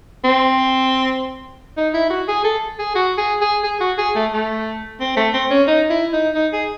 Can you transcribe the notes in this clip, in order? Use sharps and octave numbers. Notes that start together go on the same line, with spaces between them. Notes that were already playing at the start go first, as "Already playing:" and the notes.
C4
D#4
E4
F#4
G#4
A4
G#4
F#4
G#4
G#4
G#4
F#4
G#4
A3
A3
C4
A3
C4
C#4
D#4
E4
D#4
D#4
G#4